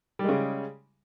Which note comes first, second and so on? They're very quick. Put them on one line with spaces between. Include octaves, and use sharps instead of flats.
G3 G#3 C#3